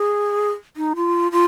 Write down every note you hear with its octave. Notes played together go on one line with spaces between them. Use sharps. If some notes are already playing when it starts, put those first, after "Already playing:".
Already playing: G#4
D#4
F4
F4